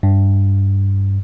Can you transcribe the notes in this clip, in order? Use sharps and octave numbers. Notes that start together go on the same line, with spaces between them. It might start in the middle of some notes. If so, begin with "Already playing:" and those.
G2